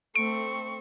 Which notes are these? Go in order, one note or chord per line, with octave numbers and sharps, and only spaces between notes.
A3 C4 C#6 D7